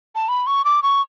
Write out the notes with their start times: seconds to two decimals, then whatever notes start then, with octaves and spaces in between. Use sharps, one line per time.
0.15 A5
0.29 B5
0.47 C#6
0.65 D6
0.83 C#6